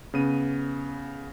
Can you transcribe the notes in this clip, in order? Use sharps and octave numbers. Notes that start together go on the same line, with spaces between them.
C#3 B3 D#7